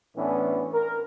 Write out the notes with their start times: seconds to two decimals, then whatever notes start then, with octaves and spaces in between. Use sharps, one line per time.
0.16 A2 E3 B3 C#4 D4
0.73 A#4